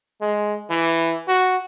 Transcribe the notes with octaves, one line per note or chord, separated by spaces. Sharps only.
G#3
E3
F#4